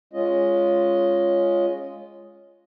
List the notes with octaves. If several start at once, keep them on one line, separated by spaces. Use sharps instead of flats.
G#3 C#4 F4 D#5